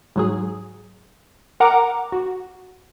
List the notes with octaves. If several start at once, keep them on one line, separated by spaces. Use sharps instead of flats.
G#2 F#3 G#4
A#4 F#5 A#5 D6
F#4